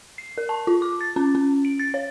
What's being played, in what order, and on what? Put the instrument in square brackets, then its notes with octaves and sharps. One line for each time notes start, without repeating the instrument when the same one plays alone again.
[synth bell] C7
A#4
A5
F4
D6
A6
C#4
C#4
D7
A6
C#5